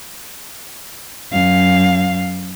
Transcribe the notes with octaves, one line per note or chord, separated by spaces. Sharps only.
F#2 F5